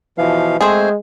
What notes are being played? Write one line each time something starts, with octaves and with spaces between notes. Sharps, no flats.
B2 E3 F3 F5
G#3 A3 C4 G#4 C5